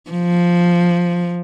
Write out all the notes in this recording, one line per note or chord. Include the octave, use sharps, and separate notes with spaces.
F3